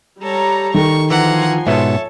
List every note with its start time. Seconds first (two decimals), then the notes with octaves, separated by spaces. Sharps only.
0.23 G3 A4 C#5 A#5
0.74 D#3 A4 C#6
1.10 E3 F3 F#5 G#5 A#5 C6
1.67 G#2 B2 B3 A4 C#5 E5